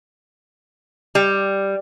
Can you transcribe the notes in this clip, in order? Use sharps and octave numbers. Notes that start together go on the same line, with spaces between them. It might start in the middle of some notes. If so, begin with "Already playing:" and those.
G3